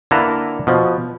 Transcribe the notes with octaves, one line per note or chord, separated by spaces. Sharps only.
D3 A#3 E4 A4 B4 A#5
B2 F3